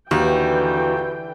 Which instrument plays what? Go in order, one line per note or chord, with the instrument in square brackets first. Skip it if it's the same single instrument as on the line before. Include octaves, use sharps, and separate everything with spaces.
[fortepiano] D#2 [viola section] D3 E3 G5 [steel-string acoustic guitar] F#4